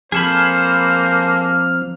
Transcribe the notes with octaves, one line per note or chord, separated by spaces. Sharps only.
F3 A#3 C4 G#4 A4 C5 B5 F6